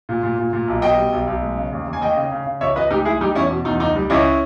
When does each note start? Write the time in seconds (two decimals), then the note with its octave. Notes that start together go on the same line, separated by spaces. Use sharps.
0.09 A#2
0.23 A#2
0.39 A#2
0.53 A#2
0.68 B1
0.82 B2 D#5 G5
0.98 G3
1.12 B1
1.27 B1
1.42 G#3
1.57 C#3
1.72 D#2
1.87 D#2
1.93 G#5
2.02 D#2 D#5 G5
2.16 C#3
2.32 C#3
2.46 C#3
2.61 C#2 C#5 E5
2.75 C#2 B4 D#5
2.90 G#3 D#4 G4
3.05 G#3 E4 G#4
3.20 G3 D#4 G4
3.35 E2 C#4 E4
3.50 B2
3.65 E2 D#4
3.80 C#2 D#4
3.95 G3
4.10 C#2 C#4 E4